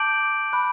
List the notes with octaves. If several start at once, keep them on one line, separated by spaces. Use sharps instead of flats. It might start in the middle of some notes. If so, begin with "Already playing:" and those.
Already playing: A5 D6 G6 D7 F#7
B5 D6 F#6